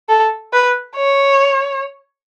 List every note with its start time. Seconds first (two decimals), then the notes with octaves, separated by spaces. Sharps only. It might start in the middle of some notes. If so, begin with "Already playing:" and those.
0.09 A4
0.53 B4
0.96 C#5